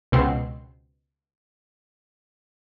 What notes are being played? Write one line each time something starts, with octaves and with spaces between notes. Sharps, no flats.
C#2 B2 C4 C7